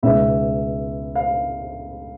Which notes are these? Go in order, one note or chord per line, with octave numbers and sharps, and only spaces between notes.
C#2 B2 G#3 B3 D#4 E5
F5